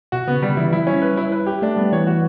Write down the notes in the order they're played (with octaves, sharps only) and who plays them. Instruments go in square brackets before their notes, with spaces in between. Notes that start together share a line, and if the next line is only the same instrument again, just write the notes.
[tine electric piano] B2 [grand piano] F#4
[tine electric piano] C#3 [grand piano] B3
[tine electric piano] D3 [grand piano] G3
[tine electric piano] E3 [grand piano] E4
[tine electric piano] F#3 [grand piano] E4
[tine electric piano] G3 [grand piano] C#4
[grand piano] B4
E4
B4
G4
[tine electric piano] A3 [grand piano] D4
[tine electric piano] G3 [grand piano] B3
[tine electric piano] E3 [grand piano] C#5
[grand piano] F#4